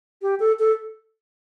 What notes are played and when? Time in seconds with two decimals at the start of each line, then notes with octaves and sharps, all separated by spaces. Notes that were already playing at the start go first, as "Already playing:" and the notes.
0.22 G4
0.40 A4
0.59 A4